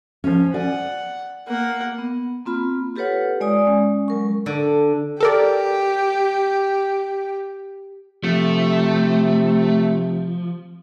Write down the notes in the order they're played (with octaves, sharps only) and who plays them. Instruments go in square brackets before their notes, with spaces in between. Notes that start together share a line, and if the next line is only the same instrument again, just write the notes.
[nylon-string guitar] F3 C#4
[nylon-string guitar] D5 G#5 [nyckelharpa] F#5
[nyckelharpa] A#3 F#5
[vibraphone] B3
A#3 C4 F4 B5
F4 G4 A4 B4 C#5 F#5
G#3 D5 G#5 D#6
G#3 C#4
F#3 A#4 C#6
[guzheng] D3
[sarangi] G4 [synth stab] A4 A#4 D5
[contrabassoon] C3 [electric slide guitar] F3 [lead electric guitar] A3